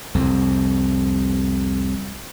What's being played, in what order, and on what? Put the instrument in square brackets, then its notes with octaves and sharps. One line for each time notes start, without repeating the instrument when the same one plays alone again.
[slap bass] C2 F2